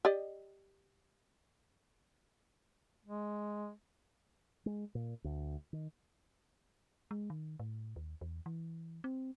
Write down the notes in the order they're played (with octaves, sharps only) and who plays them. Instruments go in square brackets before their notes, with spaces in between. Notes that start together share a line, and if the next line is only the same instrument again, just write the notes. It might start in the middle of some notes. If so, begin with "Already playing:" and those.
[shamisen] G4 D5 D#5
[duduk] G#3
[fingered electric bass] G#3
A#2
D2
D#3
[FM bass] G#3
D#3
A2
D#2
E2
E3
C4